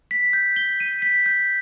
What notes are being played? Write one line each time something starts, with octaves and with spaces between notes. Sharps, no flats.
B6
G6
G7
D#7
B6
G6